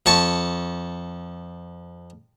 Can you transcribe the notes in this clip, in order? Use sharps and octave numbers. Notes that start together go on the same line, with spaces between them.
F2 A5 C#6